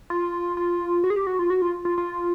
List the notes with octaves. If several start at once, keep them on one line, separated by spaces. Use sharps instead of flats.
F4
F4
F#4
G#4
G4
F#4
F4
F#4
F4
F4
F4